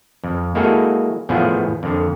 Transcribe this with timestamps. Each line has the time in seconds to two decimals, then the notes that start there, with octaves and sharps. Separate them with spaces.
0.24 F2
0.55 G#3 A#3 E4 F#4 G#4 A4
1.29 E2 A2 F3 B3 F4 G#4
1.83 F2 D3